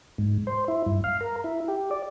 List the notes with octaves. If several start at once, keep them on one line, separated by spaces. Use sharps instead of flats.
G#2
C5
E4
G2
F5
A#4
E4
G4
D5